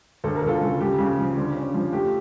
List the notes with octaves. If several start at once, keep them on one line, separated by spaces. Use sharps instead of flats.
D2 A4
A#4
D2 F4 A4
C#3
C#3 G4
C#3
F3
D3
C#4
F3
A3 G4